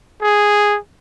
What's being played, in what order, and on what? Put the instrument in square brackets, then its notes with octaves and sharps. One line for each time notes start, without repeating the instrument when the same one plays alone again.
[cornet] G#4